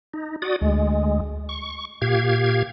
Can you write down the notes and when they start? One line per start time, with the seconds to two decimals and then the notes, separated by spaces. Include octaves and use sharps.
0.13 D#4
0.42 F#4 D5 D#6
0.61 D2 G#3
1.49 C#6
2.02 A#2 G4 F5 G#6